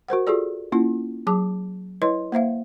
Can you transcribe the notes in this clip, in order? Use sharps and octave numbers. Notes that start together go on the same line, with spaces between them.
F#4 A#4 C5 F#5
F4 F#4 G#4 A4 D5
A#3 C#4 E4 F4
F#3 G#4 A5 D6
E4 B4 C#5 D#5 C6
A#3 C5 E5 F5